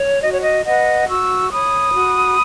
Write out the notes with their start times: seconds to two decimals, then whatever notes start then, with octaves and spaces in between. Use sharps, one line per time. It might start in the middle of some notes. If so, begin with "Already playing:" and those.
Already playing: C#5
0.23 F#4 D#5
0.32 C#5
0.42 D#5
0.65 B4 D#5 F#5
1.08 F#4 C#6 E6
1.51 C#5 B5 D#6
1.94 F#4